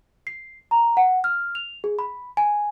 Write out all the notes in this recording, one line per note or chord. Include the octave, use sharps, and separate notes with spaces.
C7
A#5
F#5
F6
F7
G#4
B5
G#5